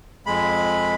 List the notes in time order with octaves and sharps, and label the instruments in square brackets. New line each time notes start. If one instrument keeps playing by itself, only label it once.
[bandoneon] F2 G#3 B5